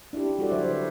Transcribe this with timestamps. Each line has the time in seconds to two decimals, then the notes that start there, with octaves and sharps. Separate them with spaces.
0.13 D4 E4 F4 G4
0.39 G3 F#4 A4 D5
0.51 D3 F#3 C5 C#5 E5
0.70 B4